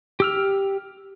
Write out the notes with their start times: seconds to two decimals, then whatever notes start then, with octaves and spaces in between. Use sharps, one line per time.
0.20 G4 E6 F6